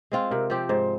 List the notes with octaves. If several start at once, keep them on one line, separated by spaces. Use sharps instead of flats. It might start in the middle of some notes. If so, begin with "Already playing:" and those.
G#3 C4 F4
C3 A#4
F3 C4 G4
G#2 C5